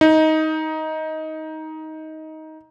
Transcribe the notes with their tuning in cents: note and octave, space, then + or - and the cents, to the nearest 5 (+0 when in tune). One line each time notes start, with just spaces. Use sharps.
D#4 +15